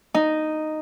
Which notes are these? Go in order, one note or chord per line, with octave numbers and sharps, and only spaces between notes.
D#4